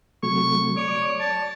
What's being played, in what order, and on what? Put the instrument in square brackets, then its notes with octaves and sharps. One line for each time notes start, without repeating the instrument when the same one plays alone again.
[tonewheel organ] C3 F#3 A3 [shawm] C#6
[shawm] C#5 [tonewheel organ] D5 D6
[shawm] A5